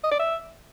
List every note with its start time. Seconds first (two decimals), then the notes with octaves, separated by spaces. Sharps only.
0.04 D#5
0.11 D5
0.19 E5